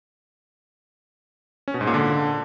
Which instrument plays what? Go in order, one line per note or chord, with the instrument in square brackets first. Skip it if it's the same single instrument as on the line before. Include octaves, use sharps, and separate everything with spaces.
[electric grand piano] C#4
B2
G#2
A#2
D3